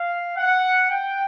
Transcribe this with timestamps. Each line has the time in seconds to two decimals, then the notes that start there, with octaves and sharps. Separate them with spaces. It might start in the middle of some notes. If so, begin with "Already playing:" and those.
Already playing: F5
0.37 F#5
0.90 G5